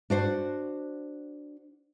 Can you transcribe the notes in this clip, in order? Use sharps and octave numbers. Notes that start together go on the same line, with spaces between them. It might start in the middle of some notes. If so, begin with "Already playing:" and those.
D4 F#4 C5